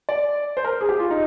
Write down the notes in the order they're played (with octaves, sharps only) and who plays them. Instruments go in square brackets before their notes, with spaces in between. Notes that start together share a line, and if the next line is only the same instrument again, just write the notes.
[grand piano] D5
C5
A#4
G#4
G4
F4
D#4